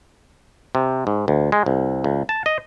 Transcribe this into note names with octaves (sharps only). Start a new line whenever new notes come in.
C3
G#2
D2
G#3
C2
C#2
A5
D#5